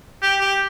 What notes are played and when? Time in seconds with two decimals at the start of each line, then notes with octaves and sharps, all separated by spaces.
0.22 G4
0.41 G4